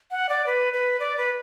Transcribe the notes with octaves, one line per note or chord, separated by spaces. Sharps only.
F#5
D5
B4
B4
D5
B4